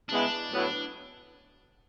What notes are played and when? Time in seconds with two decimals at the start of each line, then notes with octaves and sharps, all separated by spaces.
0.09 C#3 G#3 B3 D4 E4
0.52 A2 F#3 B3 E4